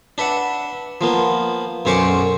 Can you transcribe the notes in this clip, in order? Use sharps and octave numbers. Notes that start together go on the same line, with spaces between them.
D4 B4 E5 F#5
F3 A#3 B3
B1 F#2 C#4 C5 C#6 D6